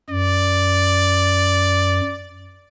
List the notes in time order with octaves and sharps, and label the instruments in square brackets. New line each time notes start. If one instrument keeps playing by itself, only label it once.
[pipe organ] F#2 [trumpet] D5